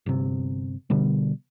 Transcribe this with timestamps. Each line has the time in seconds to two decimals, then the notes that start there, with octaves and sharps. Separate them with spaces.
0.06 G1 C3
0.90 B2 D3 G3